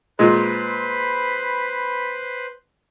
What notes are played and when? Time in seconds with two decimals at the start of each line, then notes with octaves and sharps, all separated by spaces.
0.19 A#2 G#3 B4 C5 B5